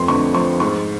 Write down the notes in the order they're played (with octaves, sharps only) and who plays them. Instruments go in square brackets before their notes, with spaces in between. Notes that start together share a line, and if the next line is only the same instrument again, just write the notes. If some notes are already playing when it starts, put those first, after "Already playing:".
Already playing: [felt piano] F2 A3 C6
D3 C#6
F3 C#6
G#2 C#6